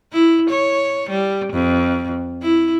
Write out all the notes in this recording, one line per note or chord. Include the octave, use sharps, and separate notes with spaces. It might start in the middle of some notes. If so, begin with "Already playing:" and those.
E4
C#5
G3
F2
E4